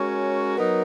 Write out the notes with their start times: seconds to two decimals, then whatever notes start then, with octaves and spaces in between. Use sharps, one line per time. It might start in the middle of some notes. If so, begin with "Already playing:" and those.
Already playing: G#3 C#4 F#4 A#4 C#5
0.57 F#3 B3 D#4 A#4